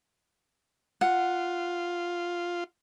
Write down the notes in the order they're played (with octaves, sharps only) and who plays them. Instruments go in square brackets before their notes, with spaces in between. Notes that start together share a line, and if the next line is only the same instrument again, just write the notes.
[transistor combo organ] F4 [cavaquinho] F#5